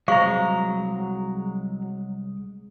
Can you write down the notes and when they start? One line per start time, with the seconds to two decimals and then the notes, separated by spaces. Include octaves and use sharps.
0.08 C2 F#3 G#3 C5 F5 A#5 C#6